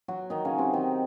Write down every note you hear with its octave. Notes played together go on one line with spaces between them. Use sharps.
F#3 F#4
D#3 D#4
C#3 C#4
C3 C4
D#3 D#4